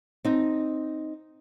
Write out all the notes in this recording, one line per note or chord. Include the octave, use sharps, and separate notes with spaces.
C4 D#4